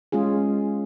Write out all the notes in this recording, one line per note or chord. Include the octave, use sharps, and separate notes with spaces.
G#3 C#4 F4 G#4